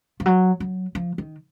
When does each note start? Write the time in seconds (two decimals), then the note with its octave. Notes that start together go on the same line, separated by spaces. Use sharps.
0.20 F3
0.26 F#3
0.60 F#3
0.95 F3
1.18 D#3